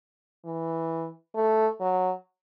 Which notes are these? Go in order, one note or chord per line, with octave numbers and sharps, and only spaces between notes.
E3
A3
F#3